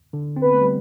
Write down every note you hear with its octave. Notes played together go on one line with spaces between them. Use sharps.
D3
C4
B3 B4
A3
G3